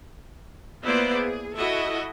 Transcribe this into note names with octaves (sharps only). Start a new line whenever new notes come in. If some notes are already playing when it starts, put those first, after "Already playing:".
A#3 B3 E4 F4 C5 D5
G#4
E4 F#4 A4 D#5 E5